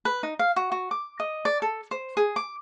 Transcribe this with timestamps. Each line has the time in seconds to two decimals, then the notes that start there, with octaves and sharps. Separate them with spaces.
0.05 B4
0.23 D#4
0.39 F5
0.56 F#4
0.72 F#4
0.91 D6
1.20 D#5
1.45 D5
1.62 A4
1.91 C5
2.17 G#4
2.36 D6